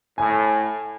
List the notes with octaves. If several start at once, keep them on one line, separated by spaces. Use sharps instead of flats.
A2 G#5